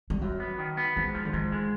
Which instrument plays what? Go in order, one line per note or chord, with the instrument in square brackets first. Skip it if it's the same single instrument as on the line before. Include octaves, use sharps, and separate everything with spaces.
[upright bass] G3
[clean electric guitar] F#2 [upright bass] F#3
[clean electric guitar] B3
D#3
B3
[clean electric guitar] G#2 [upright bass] F#3
[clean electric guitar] F3
[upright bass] D3
[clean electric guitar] G#2 [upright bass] D#3
[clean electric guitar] G#3